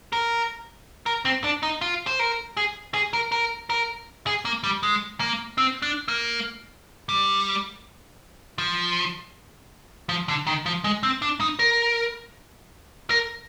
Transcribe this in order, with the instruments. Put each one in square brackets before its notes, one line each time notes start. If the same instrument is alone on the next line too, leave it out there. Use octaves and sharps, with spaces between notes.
[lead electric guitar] A#4
A#4
C4
D4
D#4
F4
C5
A#4
G#4
G#4
A#4
A#4
A#4
G#4
A#3
G3
G#3
A#3
C4
D4
A#3
G3
F3
F3
D3
D#3
F3
G#3
C4
D4
D#4
A#4
A#4